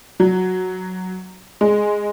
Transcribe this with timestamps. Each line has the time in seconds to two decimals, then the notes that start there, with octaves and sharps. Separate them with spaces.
0.20 F#3
1.61 G#3